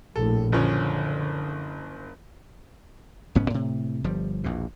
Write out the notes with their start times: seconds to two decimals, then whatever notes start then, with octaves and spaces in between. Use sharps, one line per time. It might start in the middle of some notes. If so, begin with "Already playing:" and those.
0.16 A#1 A2 A4
0.52 F#1 D3 F3 C#4
3.35 F1 G#2 B3 C#4
3.50 A2 C3
4.04 G1 F3 G3
4.44 A#1 E2 B2